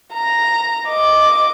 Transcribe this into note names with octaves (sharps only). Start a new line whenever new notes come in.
A#5
D#5 D6